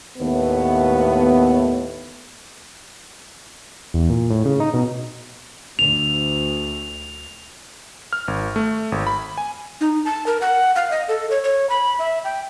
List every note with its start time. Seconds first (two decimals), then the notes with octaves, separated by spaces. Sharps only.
0.18 D#2 A2 A3 B3
3.94 E2
4.10 A#2
4.30 A2
4.45 C#3
4.60 D#4
4.74 B2
5.79 D2 F7
8.13 F6
8.28 G#1
8.56 A3
8.92 G#1
9.07 B5
9.38 G#5
9.81 D#4
10.05 A5
10.27 A#4
10.41 F#5
10.76 F5
10.91 D#5
11.08 A4
11.31 C#5
11.44 C#5
11.70 B5
11.99 E5
12.24 G5